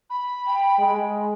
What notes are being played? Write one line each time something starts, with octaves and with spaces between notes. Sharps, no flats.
B5
G5
G#3